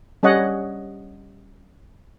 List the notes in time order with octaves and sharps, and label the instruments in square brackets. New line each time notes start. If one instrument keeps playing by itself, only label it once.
[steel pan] G3 C#4 C#5 D#5 F#5